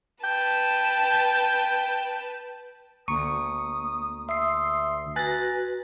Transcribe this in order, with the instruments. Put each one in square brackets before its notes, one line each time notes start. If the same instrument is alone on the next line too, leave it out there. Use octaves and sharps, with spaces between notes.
[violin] B4 A5 [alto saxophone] G5
[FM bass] D2 [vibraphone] A#3 [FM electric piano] C#6 [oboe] D#6
[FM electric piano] E5 C7 [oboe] C6 [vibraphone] D#6 E6
[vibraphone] F#4 B4 [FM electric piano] G#5 F#6 A6 [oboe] A#5